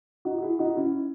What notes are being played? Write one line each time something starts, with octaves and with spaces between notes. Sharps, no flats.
D#4 F#4
F#4
E4 G#4
D#4 F#4
F#4
C#4 E4